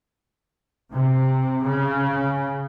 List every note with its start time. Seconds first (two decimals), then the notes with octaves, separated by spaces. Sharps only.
0.92 C3
1.66 C#3